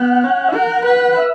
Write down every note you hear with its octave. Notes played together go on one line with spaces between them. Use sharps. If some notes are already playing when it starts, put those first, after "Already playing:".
Already playing: B3 F#5
C#4
E5
A#4 F#5
B4
E5